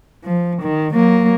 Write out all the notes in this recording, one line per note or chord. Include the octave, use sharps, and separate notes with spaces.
F3
D#3
F#3 A#3